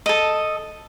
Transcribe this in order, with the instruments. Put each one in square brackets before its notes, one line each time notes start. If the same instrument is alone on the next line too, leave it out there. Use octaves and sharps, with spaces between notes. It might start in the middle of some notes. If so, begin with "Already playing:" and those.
[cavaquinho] A4 D#5